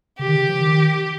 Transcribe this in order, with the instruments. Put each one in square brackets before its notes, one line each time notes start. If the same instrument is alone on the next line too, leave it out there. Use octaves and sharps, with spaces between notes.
[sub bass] C#3 [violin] G4
[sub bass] D#3
C#3
F3
D#3